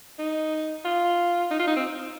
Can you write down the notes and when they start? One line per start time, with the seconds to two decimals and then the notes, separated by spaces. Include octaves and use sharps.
0.19 D#4
0.85 F4
1.51 D#4
1.60 F4
1.67 D#4
1.76 C4